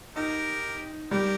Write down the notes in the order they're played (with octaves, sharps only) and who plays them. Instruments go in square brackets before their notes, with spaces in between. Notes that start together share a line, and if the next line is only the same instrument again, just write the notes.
[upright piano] D#4 [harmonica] G4 A#4
[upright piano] G3 [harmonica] G4 A#4